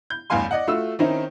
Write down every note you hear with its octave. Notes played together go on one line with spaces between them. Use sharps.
G6
A1 E2 G2 F5 G#5 C6
D5 D#5 F#5
A3 F4 F#4 E6
D#3 C4 C#4 D#4 E4